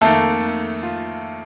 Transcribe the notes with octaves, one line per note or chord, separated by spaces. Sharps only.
F2 D#3 A3 A#3 A4
F4